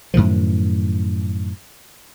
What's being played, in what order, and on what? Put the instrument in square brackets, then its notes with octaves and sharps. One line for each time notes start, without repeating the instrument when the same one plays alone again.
[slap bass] F#2 A2 D#3 F3